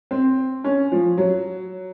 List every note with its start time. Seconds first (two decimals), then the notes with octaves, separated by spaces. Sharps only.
0.11 C4
0.64 C#4
0.92 F3
1.18 F#3